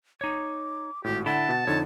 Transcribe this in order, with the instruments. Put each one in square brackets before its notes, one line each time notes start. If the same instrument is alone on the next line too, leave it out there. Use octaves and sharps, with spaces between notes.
[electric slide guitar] D#4 C#5 [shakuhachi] D6
[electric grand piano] G#1 A2 [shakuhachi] F#4 [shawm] G4
[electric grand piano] D3 [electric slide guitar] E4 A4 E5 [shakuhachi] F#5 [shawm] A5
[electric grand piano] B2 A6
[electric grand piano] F2 D3 [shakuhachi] D#4 [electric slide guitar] C#5